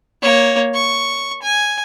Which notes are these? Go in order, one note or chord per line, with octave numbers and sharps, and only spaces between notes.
A#3 C#5
C#6
G#5